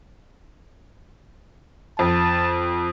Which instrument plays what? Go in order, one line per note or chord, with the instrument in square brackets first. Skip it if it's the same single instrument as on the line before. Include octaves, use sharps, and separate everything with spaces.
[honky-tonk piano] F2 [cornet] A5